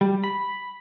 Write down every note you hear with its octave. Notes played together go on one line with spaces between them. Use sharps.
G3
B5